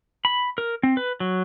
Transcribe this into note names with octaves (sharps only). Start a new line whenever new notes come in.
B5
A#4
C4
B4
F#3